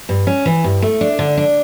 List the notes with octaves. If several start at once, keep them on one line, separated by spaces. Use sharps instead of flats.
G2
C#4
E3
G2
A3
D4
D3
D4